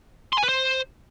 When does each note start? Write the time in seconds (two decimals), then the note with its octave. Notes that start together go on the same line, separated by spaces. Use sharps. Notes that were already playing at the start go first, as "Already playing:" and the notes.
0.33 C6
0.38 G#5
0.43 B4
0.49 C5